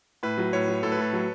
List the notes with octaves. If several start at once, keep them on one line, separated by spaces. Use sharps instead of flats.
A2 B4
F#3
A2 C#5
F#3
A2 A4
B4
A2 A4
F#3